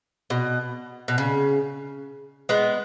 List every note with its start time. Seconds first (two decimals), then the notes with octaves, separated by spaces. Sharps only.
0.30 B2
1.08 B2
1.18 C#3
2.49 G#3 B3